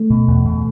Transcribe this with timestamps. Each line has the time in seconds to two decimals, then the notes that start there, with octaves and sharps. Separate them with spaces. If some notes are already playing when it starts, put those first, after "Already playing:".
Already playing: A3
0.10 B2
0.28 E2
0.45 B2